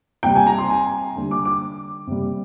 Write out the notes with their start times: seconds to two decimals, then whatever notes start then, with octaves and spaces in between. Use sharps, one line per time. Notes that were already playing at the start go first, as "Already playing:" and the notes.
0.23 C3 G3 G5
0.36 G#5
0.47 A#5
0.58 C6
0.70 G#5
1.16 D3 G3
1.31 D6
1.45 D6
2.07 C3 G3